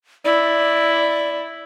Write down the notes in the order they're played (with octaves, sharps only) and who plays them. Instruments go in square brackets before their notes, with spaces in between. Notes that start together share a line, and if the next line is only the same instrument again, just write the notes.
[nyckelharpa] E4 [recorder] D5